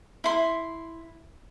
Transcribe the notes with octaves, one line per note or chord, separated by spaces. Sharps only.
E4 C6